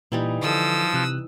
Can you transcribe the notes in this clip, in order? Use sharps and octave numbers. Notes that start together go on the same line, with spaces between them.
A#2 E3 G3 D#4
D3 F3 A4 D#6 E6
C3 F#6